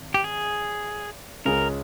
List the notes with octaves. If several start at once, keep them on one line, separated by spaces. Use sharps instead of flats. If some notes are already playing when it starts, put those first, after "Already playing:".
Already playing: G#1
G4
G#4
C#2 C#3 G#3 C#4 G#4 A#4